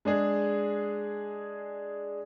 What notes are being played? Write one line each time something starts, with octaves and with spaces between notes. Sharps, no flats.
G#3 D4 G#4